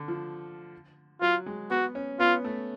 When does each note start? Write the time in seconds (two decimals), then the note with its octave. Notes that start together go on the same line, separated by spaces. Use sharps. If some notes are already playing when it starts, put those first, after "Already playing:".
Already playing: D3
0.08 F3
1.22 F#3 F4
1.46 G#3
1.70 B3 F#4
1.95 C#4
2.19 B3 F4
2.44 A3